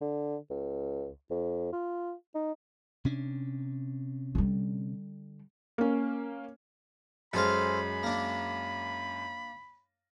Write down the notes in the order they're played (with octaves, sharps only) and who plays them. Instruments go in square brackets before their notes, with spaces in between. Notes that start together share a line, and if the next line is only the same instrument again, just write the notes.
[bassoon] D3
C#2
F2
F4
D#4
[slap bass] C3 C#4 D4
[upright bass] D3 G3
[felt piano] A#3 C#4
[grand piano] F#2 G#3 [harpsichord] A4 C5 F5 [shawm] B5
[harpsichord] A#3 D4